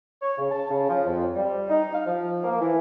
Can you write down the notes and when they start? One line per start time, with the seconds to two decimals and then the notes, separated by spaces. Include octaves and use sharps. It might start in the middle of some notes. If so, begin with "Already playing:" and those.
0.22 C#5
0.38 C#3
0.52 A5
0.71 C#3
0.89 F3
1.06 F2
1.36 G3
1.70 D#4
1.94 F5
2.07 F3
2.44 A#3
2.61 E3